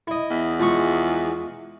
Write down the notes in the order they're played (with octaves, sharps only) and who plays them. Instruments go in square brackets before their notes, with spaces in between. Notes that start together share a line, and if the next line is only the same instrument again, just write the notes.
[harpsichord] E4 D#5
[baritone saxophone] E2
[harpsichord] F3 G#3 C#6